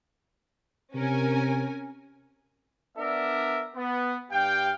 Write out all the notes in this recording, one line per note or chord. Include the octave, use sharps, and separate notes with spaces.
C3 C#4 A#4 G#5
B3 D4 A#4 D5 E5
B3
G2 G4 F5 G5